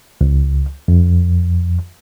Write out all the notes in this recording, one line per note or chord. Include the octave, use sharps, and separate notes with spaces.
C#2
F2